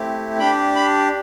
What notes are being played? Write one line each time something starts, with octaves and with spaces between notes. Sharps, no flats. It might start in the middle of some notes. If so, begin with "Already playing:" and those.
Already playing: A3 C4 E4 G4
D4 G4 G5 B5
B5